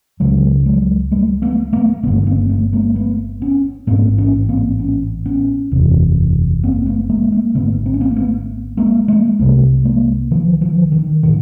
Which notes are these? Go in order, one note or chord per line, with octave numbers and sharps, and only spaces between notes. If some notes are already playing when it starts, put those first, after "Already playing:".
C#2 C#3 F#3 G#3
F#3 G#3
G3 A3
A3 B3
A3 B3
G1 G2 D3 A3 B3
C#4
A#3 C4
A3 B3
G#3 A#3
A3 B3
B3 C#4
A1 G#2 A#3 C4
B3 C#4
A#3 C4
B3 C#4
B3 C#4
F#1 E2 C3
A#3 C4
A3 B3
G#3 A#3
A3
G#3 A#3
G#1 G2 D3 A3 B3
C4
C#4
A#3 C4
A#3
A3 B3
G#3 A#3
G#3 A#3
C2 C3 G3 A3
G#3 A#3
D#3 F3
D#3 F3
D#3
A2 D#3